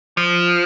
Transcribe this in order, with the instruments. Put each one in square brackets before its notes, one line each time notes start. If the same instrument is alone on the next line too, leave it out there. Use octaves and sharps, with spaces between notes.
[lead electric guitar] F3